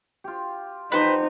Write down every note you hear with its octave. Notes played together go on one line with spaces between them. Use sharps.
F4 G4
F3 D#4 G4 B4 C5 F#5